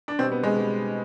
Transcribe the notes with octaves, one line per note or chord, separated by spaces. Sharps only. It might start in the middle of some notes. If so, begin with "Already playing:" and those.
D4
B2 G3 C4
B3
G#3
B2 G3